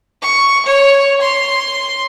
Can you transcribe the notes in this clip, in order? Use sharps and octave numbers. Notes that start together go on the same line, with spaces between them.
C#6
C#5
C6